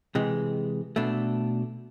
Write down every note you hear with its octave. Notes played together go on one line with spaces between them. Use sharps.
C3 E3 G#3
B2 A3 D4